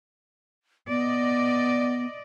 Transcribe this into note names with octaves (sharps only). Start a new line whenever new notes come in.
B3 D5 D#5